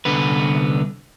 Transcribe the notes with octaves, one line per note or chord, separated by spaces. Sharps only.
C2 D3 B3 B4